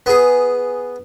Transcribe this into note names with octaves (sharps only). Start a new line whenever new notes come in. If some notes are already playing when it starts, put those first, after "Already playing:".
B3 G#4